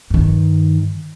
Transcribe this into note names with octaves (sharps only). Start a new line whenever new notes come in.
G2 D#3